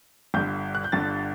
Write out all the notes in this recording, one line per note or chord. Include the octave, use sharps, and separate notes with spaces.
G1 G2 D3 G6
F#6
G6
G1 G2 D3 A6